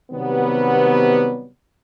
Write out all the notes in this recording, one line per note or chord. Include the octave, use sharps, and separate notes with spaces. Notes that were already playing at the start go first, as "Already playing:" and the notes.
C3 D#3 F#3 G3 B3